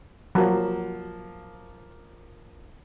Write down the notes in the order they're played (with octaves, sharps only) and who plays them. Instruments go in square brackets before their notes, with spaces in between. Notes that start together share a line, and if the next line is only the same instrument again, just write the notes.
[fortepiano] F3 A#3 [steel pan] F#3